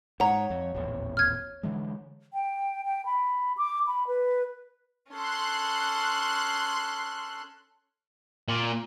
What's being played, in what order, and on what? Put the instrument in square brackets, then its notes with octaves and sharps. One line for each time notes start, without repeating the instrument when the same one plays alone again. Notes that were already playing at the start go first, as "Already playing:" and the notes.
[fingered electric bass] G#2 [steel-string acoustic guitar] C#5 [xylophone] F#5 A#5
[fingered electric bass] F2
D#1 A1 E2
[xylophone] F6 G#6
[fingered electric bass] D3 E3 G#3
[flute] G5
G5
B5
D6
B5
B4
[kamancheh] C#4 A4 [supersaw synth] C6 F#6
[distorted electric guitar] A#2